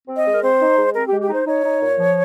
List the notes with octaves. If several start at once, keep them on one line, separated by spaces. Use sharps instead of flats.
C4
D#5
G#3
A#4
C4 C5
D#4
G#3
C4 A#4
G4
G#3
G4
D#4 C5
D#4 C#5
D#4
A#2
F3